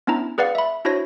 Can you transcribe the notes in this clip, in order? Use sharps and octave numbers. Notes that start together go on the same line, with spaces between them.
B3 C#4 D4 E4 A#5
G#4 B4 D5 F5 F#5
E5 B5
D4 E4 F#4 C5 C#5 A#6